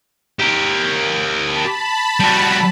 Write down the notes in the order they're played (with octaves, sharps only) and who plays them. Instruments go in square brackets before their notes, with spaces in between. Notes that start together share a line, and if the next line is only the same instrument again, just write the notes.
[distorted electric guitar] G4 A#4
[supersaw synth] A5 B5
[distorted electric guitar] G3 F#4